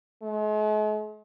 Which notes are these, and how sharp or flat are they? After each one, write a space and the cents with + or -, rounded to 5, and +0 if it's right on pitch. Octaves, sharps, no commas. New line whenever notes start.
G#3 +45